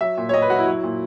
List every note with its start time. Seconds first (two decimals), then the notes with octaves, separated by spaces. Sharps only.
0.01 F#3 E5
0.17 A#2
0.29 C#5
0.34 A#2 D#5
0.42 B4
0.50 F#3 F#4
0.58 E4
0.67 F#3
0.83 A#2